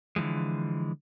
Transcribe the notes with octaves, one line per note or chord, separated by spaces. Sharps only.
D3 E3 F3 G#3